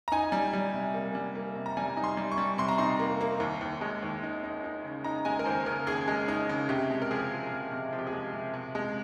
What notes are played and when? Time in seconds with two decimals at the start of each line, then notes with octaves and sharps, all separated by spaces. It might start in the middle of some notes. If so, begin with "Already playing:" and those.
0.08 A#5
0.12 D#4 G#5
0.32 G3
0.53 G3
0.74 C3
0.94 A#3
1.15 G3
1.35 A#3
1.56 C3
1.66 A#5
1.77 G3 G#5
1.97 D#4
2.04 C6
2.17 G3
2.31 C#6
2.38 G3
2.58 C3 C6
2.69 A#5
2.78 D#4 C6
2.99 A#3
3.21 A#3
3.40 D#2
3.61 D#2
3.81 G#3
4.03 D#2
4.23 D#4
4.43 D#4
4.64 D#4
4.85 C#3
5.04 D#4 A#5
5.25 G#3 G#5
5.39 A#4
5.46 D#2 C5
5.66 C#3 A#4
5.87 D#2 G#4
6.08 G#3
6.28 D#4
6.49 C#3
6.69 C3 G4
6.90 G#3
7.02 A#4
7.11 F3 G#4
7.31 F3
7.51 C3
7.72 C3
7.93 F3
7.99 G4
8.07 G#4
8.13 G#3
8.34 C3
8.54 C3
8.75 G#3